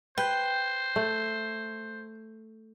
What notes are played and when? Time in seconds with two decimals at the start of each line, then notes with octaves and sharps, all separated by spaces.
0.18 B4 C5 G5
0.96 A3